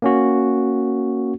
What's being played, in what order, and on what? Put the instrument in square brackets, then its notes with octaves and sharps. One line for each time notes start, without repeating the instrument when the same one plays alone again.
[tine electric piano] A#3 C#4 F#4